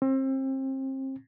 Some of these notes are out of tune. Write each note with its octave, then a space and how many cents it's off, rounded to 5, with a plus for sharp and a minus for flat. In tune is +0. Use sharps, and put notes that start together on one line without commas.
C4 +30